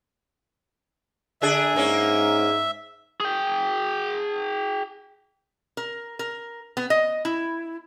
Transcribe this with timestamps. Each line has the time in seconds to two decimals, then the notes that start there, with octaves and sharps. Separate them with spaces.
1.42 D3 D4 G#4 E5
1.76 G#2 A#3 C#4
3.20 G#4 G5
5.77 A#4
6.19 A#4
6.77 B3
6.90 D#5
7.25 E4